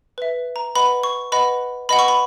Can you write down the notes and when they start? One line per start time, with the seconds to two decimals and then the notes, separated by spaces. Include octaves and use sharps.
0.18 B4 E5
0.56 A#5
0.75 B4 D#5 F#5 B5
1.03 C#6
1.32 B4 D#5 F#5 B5
1.89 B4 D#5 F#5 B5
1.99 C#6
2.08 B5